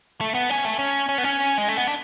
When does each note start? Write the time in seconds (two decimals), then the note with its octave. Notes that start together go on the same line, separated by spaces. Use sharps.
0.21 A3
0.34 B3
0.50 C#4
0.65 A3
0.79 C#4
1.09 C#4
1.18 B3
1.24 C#4
1.58 G#3
1.68 A3
1.77 B3
1.87 D4